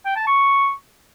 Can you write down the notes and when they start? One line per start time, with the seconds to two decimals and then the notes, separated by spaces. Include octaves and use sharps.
0.06 G5
0.16 A5
0.27 C#6